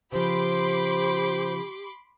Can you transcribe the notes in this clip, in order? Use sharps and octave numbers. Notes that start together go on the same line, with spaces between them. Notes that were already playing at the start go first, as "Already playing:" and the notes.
C#3 F3 G4 C5 B5 C6 D6